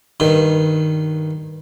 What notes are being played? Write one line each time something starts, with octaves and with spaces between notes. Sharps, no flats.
G2 D#3